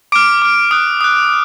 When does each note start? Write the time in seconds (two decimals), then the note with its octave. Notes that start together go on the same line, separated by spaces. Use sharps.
0.12 D6 F6 D7
0.42 D6 F6
0.71 D#6 F#6 D7
1.01 D#6 F#6